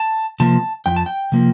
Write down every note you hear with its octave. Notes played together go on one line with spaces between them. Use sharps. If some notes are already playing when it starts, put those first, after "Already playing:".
Already playing: A5
C3 F3 A#3 A5
F2 G5
A5
G5
C3 F3 A#3